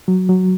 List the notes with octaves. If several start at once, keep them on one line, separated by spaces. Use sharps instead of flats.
F#3
F#3